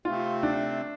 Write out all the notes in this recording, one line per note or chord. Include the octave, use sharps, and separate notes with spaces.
C3 A3 C4 F4
D4